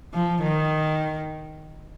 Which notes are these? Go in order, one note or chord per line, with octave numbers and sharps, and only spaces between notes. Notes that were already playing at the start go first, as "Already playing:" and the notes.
F3
D#3